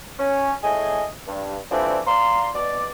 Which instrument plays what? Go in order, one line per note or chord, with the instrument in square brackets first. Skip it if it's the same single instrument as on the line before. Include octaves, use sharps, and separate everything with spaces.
[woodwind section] C#4
A2 G#4 D#5 G#5
G2
E3 F3 G3 A3 C4 D4
D5 F5 A#5 C6
B2 D5